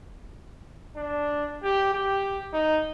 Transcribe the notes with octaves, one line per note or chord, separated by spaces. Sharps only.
D4
G4
G4
D#4